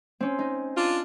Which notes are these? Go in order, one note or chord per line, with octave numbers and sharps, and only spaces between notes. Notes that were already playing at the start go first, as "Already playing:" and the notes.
C4 C#4
D#4
D4 F4